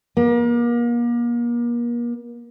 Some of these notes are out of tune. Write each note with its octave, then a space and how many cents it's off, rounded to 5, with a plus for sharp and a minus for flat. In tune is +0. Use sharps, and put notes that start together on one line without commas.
A#3 +35